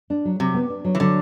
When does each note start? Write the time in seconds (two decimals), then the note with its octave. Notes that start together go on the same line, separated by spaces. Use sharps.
0.10 D4
0.25 F#3
0.39 C3 F#3
0.54 B3
0.70 D4
0.85 F#3
0.95 E3
1.00 D3 F#3